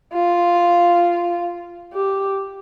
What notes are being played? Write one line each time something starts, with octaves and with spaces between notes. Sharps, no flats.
F4
G4